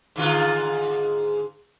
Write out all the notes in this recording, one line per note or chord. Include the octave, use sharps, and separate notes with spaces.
G#2 D3 F4